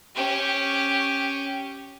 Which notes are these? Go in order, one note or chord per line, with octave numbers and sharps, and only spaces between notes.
C#4 G4